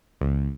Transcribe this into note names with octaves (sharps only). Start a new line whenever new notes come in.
C#2